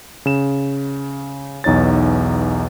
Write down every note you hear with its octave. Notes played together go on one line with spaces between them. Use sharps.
C#3 E7
B1 E2 D#4 C#5 A6